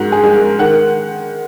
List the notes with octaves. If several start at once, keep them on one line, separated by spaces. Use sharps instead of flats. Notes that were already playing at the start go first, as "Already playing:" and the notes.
Already playing: G#2 F#4 A#4
G#4
G#3
A#4
D#3 F#5